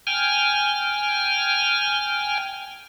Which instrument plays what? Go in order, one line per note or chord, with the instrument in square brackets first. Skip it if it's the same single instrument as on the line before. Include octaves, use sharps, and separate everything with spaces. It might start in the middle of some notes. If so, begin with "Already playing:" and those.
[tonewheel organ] G5 G#5 F6